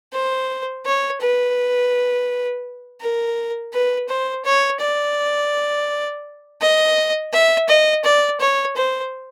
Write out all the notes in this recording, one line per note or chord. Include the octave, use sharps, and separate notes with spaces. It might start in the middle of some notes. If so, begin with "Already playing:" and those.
C5
C#5
B4
A#4
B4
C5
C#5
D5
D#5
E5
D#5
D5
C#5
C5